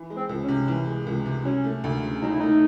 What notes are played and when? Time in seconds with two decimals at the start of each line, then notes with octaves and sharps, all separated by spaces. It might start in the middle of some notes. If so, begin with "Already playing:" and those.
Already playing: E3
0.10 G#3
0.17 C4
0.29 C#2
0.43 C#4
0.48 C3
0.68 E3
0.87 G#3
1.06 C#2
1.26 C3
1.45 F#3 C#4
1.64 A3
1.84 D2
2.03 C#3
2.22 F#3 D#4
2.31 E4
2.39 A3 D#4